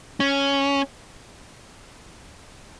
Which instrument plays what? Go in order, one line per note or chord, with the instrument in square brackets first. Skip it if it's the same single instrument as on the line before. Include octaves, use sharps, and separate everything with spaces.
[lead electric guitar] C#4